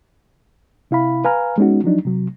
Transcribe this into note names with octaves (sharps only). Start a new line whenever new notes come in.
C3 E4 F5 B5
B4 F5 G#5 A#5 F6
G#3 B3 C#4 D#4 F#4
F3 F#3 D4 D#4
C3 F#3